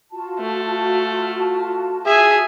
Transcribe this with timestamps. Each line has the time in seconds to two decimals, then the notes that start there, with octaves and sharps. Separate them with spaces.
0.11 F4 F#4 A5
0.39 A3
2.06 G#4 E5 G#5